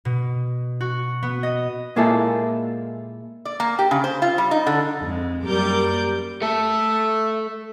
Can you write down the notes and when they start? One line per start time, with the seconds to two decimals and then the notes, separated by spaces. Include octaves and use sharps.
0.05 B2
0.81 F#4
1.23 B3
1.43 D#5
1.96 A#2 G#3 A#3 E4 F4 A4
3.45 D5
3.60 A#3
3.79 G4
3.91 C#3
4.04 C5
4.22 F4
4.38 G3
4.51 D#4
4.67 D3
5.00 F2 G#3
5.44 F#2 G3 A#3 A#4 D6 G6
6.42 A3 A4 E5